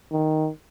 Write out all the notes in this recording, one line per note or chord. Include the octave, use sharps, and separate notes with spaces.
D#3